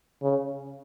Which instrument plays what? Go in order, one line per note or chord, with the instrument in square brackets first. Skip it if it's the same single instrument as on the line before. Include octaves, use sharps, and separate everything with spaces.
[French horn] C#3